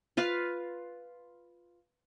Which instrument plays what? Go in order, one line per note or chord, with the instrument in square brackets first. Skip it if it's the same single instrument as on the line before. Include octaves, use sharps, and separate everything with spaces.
[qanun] F4 B4 F5